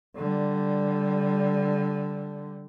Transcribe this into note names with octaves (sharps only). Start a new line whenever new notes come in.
D3 G3